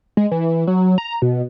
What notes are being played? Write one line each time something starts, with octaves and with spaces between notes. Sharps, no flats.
G#3
E3
F#3
A#5
B2